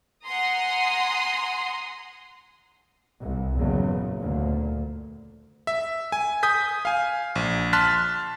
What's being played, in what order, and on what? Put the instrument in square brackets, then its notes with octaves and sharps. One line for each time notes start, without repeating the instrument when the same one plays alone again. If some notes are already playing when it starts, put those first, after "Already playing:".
[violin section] F#5 G#5 A#5 C6 D#6
[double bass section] C2
F#1 E2 G2 A#2 C#3 F#3
D2 A#2
[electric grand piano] E5
G#5
G#5 D#6 G6 B6
F5 G#5
A#1
A5 C6 F6 F#6 A6 B6